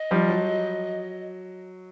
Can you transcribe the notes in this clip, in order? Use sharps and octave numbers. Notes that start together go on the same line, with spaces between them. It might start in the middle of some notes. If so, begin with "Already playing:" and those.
Already playing: D#5
F3 G3
F#3